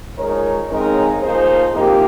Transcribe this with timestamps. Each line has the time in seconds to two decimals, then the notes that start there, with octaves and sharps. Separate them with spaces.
0.17 F3 G#3 D#4 A#4 C#5
0.69 C#3 G#3 C4 D#4 A#4 C#5
1.22 F3 A#3 D#4 G#4 C5
1.73 C3 F3 A#3 D#4 G4 A#4